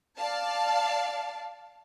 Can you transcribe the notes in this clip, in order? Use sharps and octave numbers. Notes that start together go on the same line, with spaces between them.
D5 F5 A5